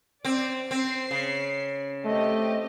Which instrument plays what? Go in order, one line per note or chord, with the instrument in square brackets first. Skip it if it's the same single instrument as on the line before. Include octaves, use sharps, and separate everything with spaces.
[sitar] C4 [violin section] D5
[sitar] C4 [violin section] C7
[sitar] C#3
[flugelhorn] A3 [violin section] C4 G4 D#5